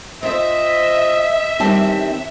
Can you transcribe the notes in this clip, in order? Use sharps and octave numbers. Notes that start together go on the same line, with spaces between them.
C4 F4 C5 D#5 E5
D#3 E3 G3 C4 C#4 A5